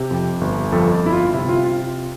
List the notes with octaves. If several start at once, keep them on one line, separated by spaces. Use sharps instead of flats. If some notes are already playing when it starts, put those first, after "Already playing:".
Already playing: C3 G4
F2
G1
F2 F4 A4
G1 E4
F4
C3 E4
F4
F4